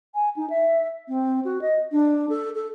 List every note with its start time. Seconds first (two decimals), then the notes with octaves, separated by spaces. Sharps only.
0.14 G#5
0.36 D#4
0.50 E5
1.08 C4
1.45 F#4
1.61 D#5
1.92 D4
2.29 A4
2.55 A4